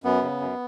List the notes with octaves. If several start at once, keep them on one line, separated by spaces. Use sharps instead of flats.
F#2 B3
C#3
F#2